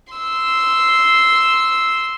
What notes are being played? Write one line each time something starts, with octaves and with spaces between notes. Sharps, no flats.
C6 E6